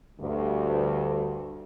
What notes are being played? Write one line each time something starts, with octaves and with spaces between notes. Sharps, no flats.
D2 G2